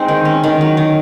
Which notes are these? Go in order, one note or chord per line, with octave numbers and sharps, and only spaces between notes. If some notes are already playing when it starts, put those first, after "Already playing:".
Already playing: G#3 C4 D#4
D#3
C#4
D#3
F#3
D#3